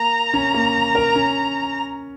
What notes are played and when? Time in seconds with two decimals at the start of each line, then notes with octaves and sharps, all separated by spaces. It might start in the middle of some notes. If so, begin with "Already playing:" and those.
Already playing: A#3 A#5
0.34 C#4
0.54 A#3
0.95 A#4
1.15 C#4